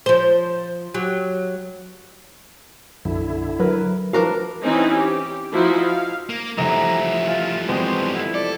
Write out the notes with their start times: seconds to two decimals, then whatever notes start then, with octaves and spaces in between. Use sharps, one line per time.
0.06 F3 C5
0.94 F#3 G4
3.05 B1 F#2 D3 E4
3.60 F#3 A#4 B4
4.13 E3 F3 D4 F#4 A#4 B4 F5
4.62 E3 C4 C#4 D#4
4.93 G4
5.52 F3 D#4 E4 F#4 C5
5.82 F5
6.29 A#3
6.58 F1 E3 G3 G4 E5 A#5
7.27 F4
7.69 G#3 B3 C4 D4 F#4 G4 C5
8.15 F2 E4
8.34 A4 D5